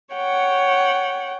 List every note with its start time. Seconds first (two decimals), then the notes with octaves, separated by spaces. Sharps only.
0.14 C#5 F#5 G5